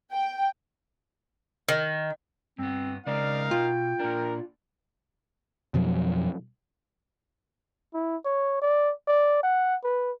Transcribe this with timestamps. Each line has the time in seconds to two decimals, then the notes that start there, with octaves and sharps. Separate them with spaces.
0.13 G5
1.69 D#3
2.58 G2 B3 C4
3.07 C#3 G#3 C4 D#4 A#4 D5 F5
3.51 B2 F4 G5
3.99 A#2 D4 A#4
5.74 F2 B2 F3 F#3
7.94 E4
8.25 C#5
8.62 D5
9.08 D5
9.43 F#5
9.84 B4